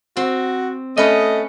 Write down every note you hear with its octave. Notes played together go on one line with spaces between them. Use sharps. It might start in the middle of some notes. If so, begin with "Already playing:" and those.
C4 F#4
A3 C#4 B4 D#5